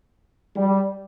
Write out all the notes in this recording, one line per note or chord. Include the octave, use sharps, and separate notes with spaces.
G3